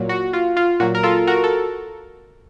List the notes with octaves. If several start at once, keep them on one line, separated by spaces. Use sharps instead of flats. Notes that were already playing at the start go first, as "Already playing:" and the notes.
Already playing: A#2 F#3
F#4
F4
F4
A#2 F#3 F#4
A#4
F4 A4
F#4 A#4
A4